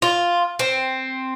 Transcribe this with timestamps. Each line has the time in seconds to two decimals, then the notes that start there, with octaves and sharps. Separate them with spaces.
0.02 F4
0.59 C4